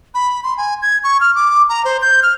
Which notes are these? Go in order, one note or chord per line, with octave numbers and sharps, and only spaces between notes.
B5
C6
G#5
G#6
C#6
F6
D6
A#5
C5
G6
F6